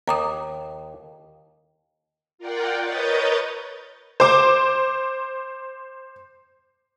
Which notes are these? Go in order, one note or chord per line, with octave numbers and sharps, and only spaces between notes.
D#2 A#5 D6 D#6
F4 A#4 D5 F#5 G5
A#4 B4 C#5 D#5 G6 A6
C5 D6